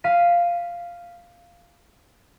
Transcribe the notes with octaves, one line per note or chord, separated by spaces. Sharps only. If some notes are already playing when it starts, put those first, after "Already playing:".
F5 B6 C7 D#7